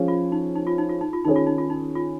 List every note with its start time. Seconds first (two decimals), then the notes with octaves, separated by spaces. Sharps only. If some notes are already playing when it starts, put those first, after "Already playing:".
Already playing: F3 C#4 G#4 C#5
0.08 F4
0.32 D#4
0.55 D#4
0.67 F4
0.78 D#4
0.89 F4
1.01 D#4
1.13 F4
1.25 D#3 C#4 D#4 G#4 C#5
1.36 F4
1.47 D#4
1.58 F4
1.70 D#4
1.95 F4